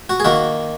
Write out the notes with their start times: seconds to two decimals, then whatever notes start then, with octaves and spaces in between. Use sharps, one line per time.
0.10 F#4
0.20 G#4
0.25 D#3 A#3 F#4